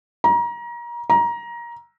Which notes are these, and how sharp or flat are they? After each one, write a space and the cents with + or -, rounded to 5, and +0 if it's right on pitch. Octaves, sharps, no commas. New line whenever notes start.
A#5 +30
A#5 +20